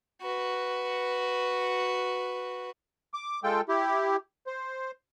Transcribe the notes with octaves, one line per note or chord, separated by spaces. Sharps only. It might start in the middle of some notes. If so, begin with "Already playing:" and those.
F#4 B4
D6
G#3 F4 A4 G5
E4 G4
C5